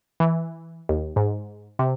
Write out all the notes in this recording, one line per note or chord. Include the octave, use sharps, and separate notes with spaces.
E3
D#2
G#2
C3